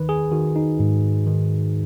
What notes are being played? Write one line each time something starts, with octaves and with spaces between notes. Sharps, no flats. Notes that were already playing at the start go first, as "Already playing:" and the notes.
Already playing: D#3 B4
G#4
D#3 F#4
D#4
G#2
D#3